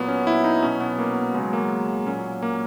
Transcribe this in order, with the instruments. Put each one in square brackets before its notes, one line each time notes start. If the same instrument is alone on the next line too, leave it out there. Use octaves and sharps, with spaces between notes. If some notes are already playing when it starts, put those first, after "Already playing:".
Already playing: [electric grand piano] A#2 F#3 B3
C#4
E4
D#4
B2 F#3 C#4
B3
A#3
C#3 F#3 G#3
A#3
A#2 F#3 C#4
A#3